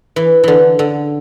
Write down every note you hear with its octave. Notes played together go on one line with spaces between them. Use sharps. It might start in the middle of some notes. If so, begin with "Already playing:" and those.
E3
D3 E3
D3